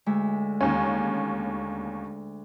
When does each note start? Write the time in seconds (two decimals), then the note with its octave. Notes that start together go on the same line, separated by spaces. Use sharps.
0.06 D2 G#3 E5
0.61 D#2 C#4